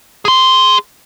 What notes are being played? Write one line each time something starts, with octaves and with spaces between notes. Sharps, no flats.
G#4 C6